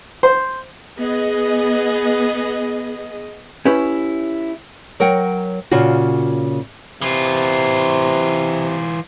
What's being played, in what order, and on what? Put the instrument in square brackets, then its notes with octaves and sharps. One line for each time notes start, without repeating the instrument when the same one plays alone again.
[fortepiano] C5
[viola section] B3 G#4 D#5
[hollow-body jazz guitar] C#4 E4 G4 B4 C#5
[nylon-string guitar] F#3 A#4 F#5 G5
A#2 C#3 F4 F#4
[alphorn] C3 [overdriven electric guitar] E3 F4